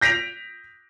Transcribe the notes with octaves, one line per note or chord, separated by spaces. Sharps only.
G6 A#6 B6 D7 F7